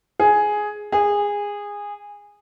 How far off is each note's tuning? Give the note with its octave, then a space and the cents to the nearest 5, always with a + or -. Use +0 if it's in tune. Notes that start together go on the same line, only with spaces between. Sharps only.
G#4 +5
G#4 -20